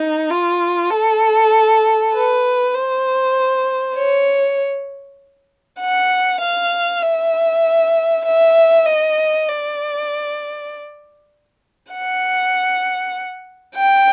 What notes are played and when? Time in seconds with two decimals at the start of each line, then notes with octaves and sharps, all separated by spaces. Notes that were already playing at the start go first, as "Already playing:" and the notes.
Already playing: D#4
0.30 F4
0.91 A4
2.14 B4
2.74 C5
3.97 C#5
5.81 F#5
6.41 F5
7.02 E5
8.25 E5
8.86 D#5
9.48 D5
11.92 F#5
13.75 G5